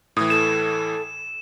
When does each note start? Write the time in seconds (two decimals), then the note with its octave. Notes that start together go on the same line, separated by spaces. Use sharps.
0.17 A2 E3 D#6
0.30 A4 E7